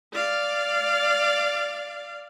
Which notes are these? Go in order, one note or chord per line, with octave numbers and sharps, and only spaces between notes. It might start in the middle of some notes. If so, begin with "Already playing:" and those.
D5 F5